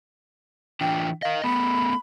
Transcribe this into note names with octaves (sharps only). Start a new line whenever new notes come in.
E3 D4 F4 G5
A#4 D#5 F5
A3 B3 B5